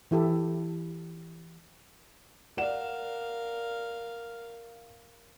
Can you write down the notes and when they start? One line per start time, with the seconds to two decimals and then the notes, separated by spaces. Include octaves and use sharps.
0.11 E3 E4 G4 A4
2.57 A#4 D5 F5 F#5 E7